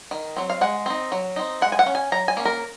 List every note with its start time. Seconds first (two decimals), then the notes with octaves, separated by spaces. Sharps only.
0.11 D#3
0.36 F#3 C4
0.50 F5
0.61 G#3 F#5
0.86 C4 D#4
1.12 F#3
1.36 C4 D#4
1.61 G#3 F#5
1.72 G#5
1.79 F#5
1.86 C#4
1.95 G#5
2.12 F#3 A#5
2.28 G#5
2.37 A#3 C#4
2.45 A#4